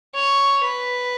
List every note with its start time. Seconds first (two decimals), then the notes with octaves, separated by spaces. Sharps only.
0.15 C#5
0.64 B4